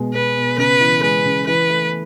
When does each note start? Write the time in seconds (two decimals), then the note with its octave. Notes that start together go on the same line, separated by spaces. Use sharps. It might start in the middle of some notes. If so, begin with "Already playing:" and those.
Already playing: B2 G#3
0.14 B2 B4
0.37 B2
0.58 C#3 B4
0.81 E3
1.02 G#3 B4
1.25 C#3
1.47 E3 B4
1.70 A3